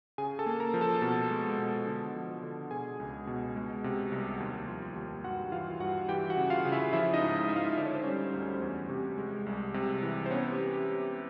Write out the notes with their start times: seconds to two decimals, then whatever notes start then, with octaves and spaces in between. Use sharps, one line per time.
0.18 C#3 G#4 G#5
0.39 A4 A5
0.46 A#3
0.60 A#4 A#5
0.74 F3
0.81 A4 A5
1.02 B2
1.30 G#3
1.58 B2
1.87 D3
2.15 F3
2.43 D3
2.71 B2 G#4 G#5
3.00 C#2
3.27 B2
3.56 G#3
3.84 C3
4.12 C2
4.40 D#2
4.68 F3
4.96 D#2
5.24 G2 F#4 F#5
5.52 E3 F4 F5
5.80 G2 F#4 F#5
6.08 E3 G4 G5
6.30 F#4 F#5
6.37 C#3
6.50 F4 F5
6.65 C#3
6.72 E4 E5
6.93 F3 E4 E5
7.14 D#4 D#5
7.21 G#2
7.35 E4 E5
7.49 G#2 E5
7.56 F4 F5
7.78 D3 D5
7.86 C#5
7.95 C5
8.03 G3 C#4 C#5
8.34 D2
8.62 E2
8.89 C3
9.18 G#3
9.46 C2
9.74 C3
10.03 E3
10.26 C5
10.30 B3 C#4 C#5
10.52 G4
10.59 B3
10.73 G4